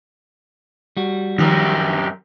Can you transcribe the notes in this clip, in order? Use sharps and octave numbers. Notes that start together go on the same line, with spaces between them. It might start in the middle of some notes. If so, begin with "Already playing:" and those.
G3 F#4
F#2 D#3 F3 G4 A#4